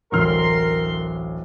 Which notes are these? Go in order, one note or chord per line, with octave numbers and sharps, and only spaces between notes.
D1 A1 A#4 C6 F6